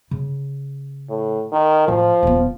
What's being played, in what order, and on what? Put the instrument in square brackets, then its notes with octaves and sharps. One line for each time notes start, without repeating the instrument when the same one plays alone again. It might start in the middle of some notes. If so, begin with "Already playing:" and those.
[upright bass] C#3
[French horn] A2
D#3
[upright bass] A1 [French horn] F3
[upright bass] D#1 B3